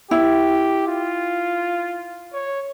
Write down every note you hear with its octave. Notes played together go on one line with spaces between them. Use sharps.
E4 G4
F4
C#5